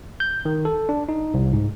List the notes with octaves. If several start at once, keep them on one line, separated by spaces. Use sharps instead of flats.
G6
D#3
A4
D4
D#4
C2
G#2